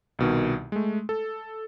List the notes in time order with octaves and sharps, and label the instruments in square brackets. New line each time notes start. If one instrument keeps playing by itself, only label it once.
[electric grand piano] C2 B2 D#3
G#3 A3
A4